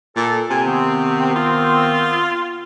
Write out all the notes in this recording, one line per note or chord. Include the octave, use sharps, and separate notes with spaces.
A#2 A4
C3 G#5
D#3 B3 C4
F4